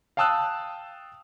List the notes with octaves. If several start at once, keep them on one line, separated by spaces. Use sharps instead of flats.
F5 G5 A5 D#6 E6 F#6